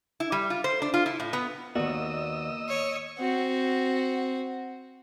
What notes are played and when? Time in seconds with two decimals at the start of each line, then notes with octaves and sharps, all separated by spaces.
0.20 E4
0.32 G3
0.50 F4
0.64 C5
0.82 D4
0.94 F4
1.06 E4
1.20 A2
1.33 B3
1.75 D#2 A#3 B3 F#4 D5 D#5 E6
2.69 C#5
3.19 C4 F#4